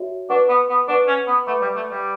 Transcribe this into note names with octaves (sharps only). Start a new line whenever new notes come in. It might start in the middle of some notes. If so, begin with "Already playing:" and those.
Already playing: F#4 C#5 E5
D4 B4 F#5 C#6
B3
B3
D4 B4 F#5 C#6
C#4
B3
A3 B4 F#5 B5 D6
G3
A3
G3